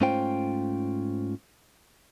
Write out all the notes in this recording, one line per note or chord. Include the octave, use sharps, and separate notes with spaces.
G#2 A3 C#4 F4 C5 G5